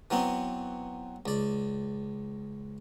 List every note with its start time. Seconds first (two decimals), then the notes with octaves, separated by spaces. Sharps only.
0.11 E3 F#3 B3 C4
1.26 C#2 D5